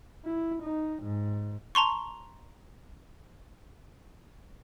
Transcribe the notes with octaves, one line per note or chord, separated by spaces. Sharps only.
E4
D#4
G#2
A5 A#5 C6 C#6